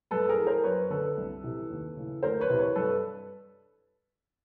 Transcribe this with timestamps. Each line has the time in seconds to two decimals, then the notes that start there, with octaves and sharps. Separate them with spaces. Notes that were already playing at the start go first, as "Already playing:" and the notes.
0.11 G2 A4 B4
0.29 G#4 A#4
0.38 E3
0.47 A#4 C5
0.64 F#2 B4 C#5
0.90 D3 A4 B4
1.17 C2
1.43 C3 E3
1.70 D#2
1.97 C#3 E3
2.23 D2 A#4 C5
2.41 B4 C#5
2.50 C3 E3
2.58 B4 C#5
2.76 G2 A4 B4